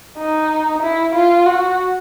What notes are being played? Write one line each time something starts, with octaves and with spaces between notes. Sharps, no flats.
D#4
E4
F4
F#4